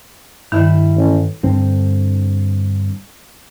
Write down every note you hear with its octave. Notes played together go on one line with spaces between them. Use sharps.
G2 D#3 G3 D4 E4
A1
G2 D3 C4